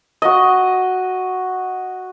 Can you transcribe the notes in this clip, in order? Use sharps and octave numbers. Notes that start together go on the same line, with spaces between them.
F#4 D#5